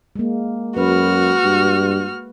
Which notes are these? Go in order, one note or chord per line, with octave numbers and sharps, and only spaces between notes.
G#3 A#3
F#2 F#4 B4 F6
G2